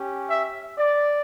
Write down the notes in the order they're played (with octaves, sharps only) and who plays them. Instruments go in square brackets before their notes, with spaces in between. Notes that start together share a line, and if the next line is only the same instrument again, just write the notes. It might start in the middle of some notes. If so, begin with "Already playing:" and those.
Already playing: [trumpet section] C#4 G4
E5
D5